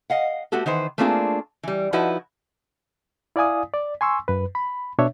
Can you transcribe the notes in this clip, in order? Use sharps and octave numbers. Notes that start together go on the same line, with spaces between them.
D#5 F5 F#5
A3 B3 F#4 G4 A4
D#3 E3 B4 C5
A3 A#3 C4 D4 F4 G#4
E3 G3
F3 D#4 E4 F#4 B4
E4 D5 F5 G#5 D#6
D5
G#5 C6 C#6 E6
F#2 B4
B5
B2 D4 C#5 E5